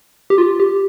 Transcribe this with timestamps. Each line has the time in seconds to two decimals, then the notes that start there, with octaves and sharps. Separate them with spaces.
0.30 G4
0.38 F4
0.60 G4